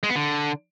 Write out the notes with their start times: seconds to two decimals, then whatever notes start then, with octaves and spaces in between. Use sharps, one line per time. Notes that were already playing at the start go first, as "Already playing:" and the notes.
0.03 G#3
0.09 B3
0.16 D3